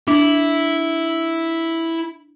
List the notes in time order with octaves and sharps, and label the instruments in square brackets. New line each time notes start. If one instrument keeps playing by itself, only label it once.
[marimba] D4 [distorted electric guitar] E4